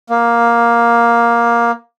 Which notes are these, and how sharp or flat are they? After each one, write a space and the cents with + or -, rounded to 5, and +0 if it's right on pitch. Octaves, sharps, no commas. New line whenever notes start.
A#3 +10